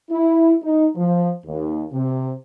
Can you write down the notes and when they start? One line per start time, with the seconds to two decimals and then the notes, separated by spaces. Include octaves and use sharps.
0.11 E4
0.62 D#4
0.96 F3
1.45 D#2
1.92 C3